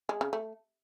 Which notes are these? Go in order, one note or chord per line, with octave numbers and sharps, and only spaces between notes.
G#3
C#3
A3